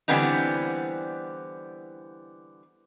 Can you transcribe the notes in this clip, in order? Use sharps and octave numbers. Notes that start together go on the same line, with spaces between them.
D3 E3 G3 B3 C4 D#4